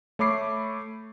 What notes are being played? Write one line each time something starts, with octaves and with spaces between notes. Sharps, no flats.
A3 C#5 B5 D6 C7